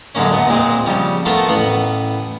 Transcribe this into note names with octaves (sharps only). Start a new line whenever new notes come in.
F#2 D3 G#3 A#3 C#4
A#2 B3
A#2 G#3 A#3 C4
C#3 F3 G3
A3 B3 F4 A4 A#4 F5
A1 B3 F5 B5